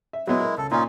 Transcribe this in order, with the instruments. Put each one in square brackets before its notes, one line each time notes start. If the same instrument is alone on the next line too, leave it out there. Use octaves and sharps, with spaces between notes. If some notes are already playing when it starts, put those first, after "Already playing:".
[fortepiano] E5
[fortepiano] F#3 B3 [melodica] G#3 E4
[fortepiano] A#4
[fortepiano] C#2 [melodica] A4
[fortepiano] A#2 [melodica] C#4 D#4 F4